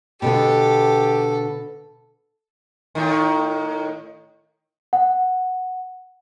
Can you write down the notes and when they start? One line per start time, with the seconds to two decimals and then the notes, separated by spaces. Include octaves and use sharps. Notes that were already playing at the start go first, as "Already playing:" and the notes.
0.22 B2 D3 B3 G4 A4
2.95 A2 D#3
4.93 F#5